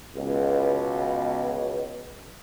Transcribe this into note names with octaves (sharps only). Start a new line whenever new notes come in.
C#2 B2